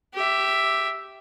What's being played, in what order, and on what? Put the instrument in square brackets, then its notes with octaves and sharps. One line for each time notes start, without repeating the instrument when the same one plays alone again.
[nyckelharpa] G4 E5